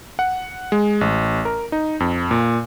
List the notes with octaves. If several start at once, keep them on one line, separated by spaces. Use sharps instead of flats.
F#5
G#3
A1
A#4
D#4
F2
A#2